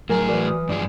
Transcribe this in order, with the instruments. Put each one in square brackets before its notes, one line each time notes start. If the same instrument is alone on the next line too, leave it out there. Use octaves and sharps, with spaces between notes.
[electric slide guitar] A2 G#4 [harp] F#3 G#5 [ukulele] A#4
[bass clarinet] E3 [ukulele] F#4 A#4 D5
[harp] D#6 F6
[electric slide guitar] G2 F3 G#4 [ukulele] D5